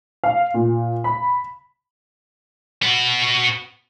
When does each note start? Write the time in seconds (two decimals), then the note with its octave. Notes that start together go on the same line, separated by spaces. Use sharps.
0.24 F5
0.54 A#2
1.04 B5
2.83 B3 F#4